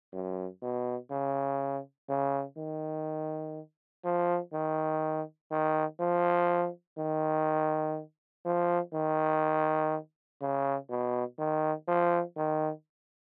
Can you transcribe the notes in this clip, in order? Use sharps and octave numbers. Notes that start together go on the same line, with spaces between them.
F#2
B2
C#3
C#3
D#3
F3
D#3
D#3
F3
D#3
F3
D#3
C#3
B2
D#3
F3
D#3